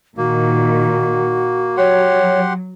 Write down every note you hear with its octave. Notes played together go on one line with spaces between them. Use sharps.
A#2 D#3 A#3 F#4
F#3 G4 C#5 F#5 C6